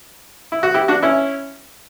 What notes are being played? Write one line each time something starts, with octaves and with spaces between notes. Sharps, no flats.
E4
F#4
E4 G4
D4 F#4
C#4 E4